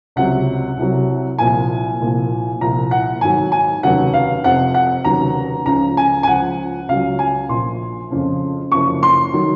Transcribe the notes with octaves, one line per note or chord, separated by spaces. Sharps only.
C#2 C3 F#3 F#5
C2 C3 F#3
C2 A#2 F3 G#5
C2 A#2 F3
C2 A#2 F3 A#5
F#5
G#1 G#2 F#3 G#5
G#5
F1 D#2 C#3 F#3 F#5
F5
F2 C3 F3 F#5
F#5
F1 D#2 C#3 F#3 A#5
C#2 C#3 F3 A#5
G#5
G#5
C#2 C#3 F3 F#5
C#2 C#3 F#3 F5
G#5
A#1 A#2 F3 C6
F2 C#3 F3
F#1 F#2 F3 C#6
C6
D#3 F#3